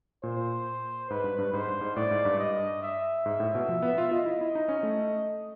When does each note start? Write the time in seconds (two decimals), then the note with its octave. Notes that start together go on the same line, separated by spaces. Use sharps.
0.23 A#2 C5
1.10 G#2 B4
1.24 G2
1.38 G2
1.53 G#2 C5
1.67 G2
1.81 G#2
1.96 A2 D5
2.11 G#2
2.25 G2
2.39 D#5
2.82 E5
3.26 G#2
3.40 A2
3.55 B2
3.69 F3
3.82 B3
3.98 F4
4.11 F4 D#5
4.26 E4
4.41 E4
4.55 D#4
4.69 C#4
4.83 A3